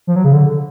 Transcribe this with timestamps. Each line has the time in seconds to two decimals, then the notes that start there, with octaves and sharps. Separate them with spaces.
0.07 F3
0.16 F#3
0.24 C#3
0.33 D3